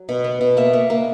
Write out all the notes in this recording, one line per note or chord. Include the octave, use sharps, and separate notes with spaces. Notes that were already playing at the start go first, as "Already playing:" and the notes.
Already playing: F#3
B2
B3
B2
A#3 E5
A#3
A#3